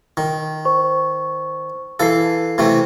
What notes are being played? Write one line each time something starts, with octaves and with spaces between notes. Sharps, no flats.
D#3
C5 C#6
E3 A4 F5 C7
C3 E3 A3